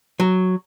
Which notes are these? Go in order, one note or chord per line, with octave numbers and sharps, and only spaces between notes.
F#3